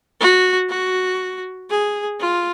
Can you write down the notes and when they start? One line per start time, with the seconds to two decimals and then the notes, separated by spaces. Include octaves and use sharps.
0.20 F#4
0.70 F#4
1.70 G#4
2.20 F4